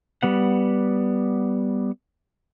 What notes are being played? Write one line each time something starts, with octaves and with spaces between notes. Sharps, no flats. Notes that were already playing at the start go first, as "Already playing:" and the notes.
G3 B3 F#5